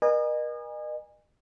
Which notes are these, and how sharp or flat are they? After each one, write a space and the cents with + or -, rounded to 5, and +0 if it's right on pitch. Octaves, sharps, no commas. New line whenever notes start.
A#4 +45 D#5 -35 G#5 -20